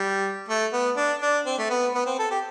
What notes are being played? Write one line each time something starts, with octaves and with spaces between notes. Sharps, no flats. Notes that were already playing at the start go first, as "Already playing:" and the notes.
Already playing: G3
A3
B3
D4
D4
C4
A3
B3
B3
C4
A4
G4